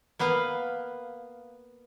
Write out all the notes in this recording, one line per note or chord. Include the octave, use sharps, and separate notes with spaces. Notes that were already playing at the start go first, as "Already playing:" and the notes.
A#3 B3 B4 F5